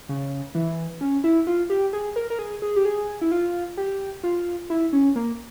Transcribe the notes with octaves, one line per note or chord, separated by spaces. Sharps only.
C#3
E3
C#4
E4
F4
G4
G#4
A#4
A#4
G#4
G#4
G4
G#4
E4
F4
G4
F4
E4
C#4
A#3